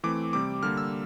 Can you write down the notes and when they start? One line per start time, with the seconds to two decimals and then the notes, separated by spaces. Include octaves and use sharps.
0.04 E3 A3 C4 D6
0.33 C3 G3 C4 D6
0.63 D3 G3 A#3 F6
0.77 E6